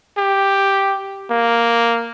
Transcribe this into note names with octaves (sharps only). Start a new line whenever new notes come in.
G4
A#3